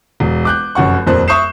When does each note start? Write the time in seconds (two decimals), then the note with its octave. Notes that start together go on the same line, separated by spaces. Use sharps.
0.20 E1
0.45 D6 F#6 G6
0.75 F1 F#2 F#5 C#6
1.07 D#1 F2 A#3 C5 F#6
1.28 E5 C#6 D#6 G6 C7 E7